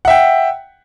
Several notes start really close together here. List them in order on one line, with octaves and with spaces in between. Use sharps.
F#5 E5 G5